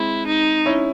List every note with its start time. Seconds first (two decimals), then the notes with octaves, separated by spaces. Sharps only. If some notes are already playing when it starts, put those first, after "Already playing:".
Already playing: G#3 C4 E4
0.27 D#4
0.66 C#4 E4